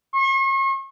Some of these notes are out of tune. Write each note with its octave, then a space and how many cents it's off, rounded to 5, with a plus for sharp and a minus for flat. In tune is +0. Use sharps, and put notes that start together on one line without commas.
C#6 -45